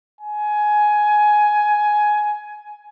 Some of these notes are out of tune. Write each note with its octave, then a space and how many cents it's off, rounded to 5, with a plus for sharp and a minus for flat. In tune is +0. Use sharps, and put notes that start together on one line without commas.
G#5 +15